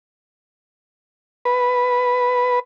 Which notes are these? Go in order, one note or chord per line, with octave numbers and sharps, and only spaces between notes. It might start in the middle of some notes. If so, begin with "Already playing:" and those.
B4